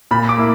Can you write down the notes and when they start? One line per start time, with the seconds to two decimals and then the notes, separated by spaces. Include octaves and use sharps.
0.11 A#2 B5
0.29 D6
0.37 A#3 E4